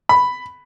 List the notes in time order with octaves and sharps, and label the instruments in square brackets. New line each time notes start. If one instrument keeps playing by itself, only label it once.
[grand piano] B5